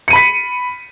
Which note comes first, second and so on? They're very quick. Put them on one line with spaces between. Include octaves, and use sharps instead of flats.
C#7 D#7 B5 B6